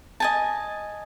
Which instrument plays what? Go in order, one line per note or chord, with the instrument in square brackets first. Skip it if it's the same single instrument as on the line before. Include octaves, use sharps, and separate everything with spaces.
[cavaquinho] D#5 G#5 A5